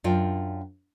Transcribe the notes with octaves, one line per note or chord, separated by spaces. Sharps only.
F#2 D4 F4 G5